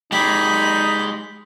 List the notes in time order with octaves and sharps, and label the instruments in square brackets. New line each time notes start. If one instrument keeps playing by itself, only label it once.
[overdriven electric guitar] G#3 G4 [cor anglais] D#4 [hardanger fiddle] B5